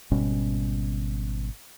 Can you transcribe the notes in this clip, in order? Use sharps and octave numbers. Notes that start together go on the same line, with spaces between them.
G#1 B2 G3 C#4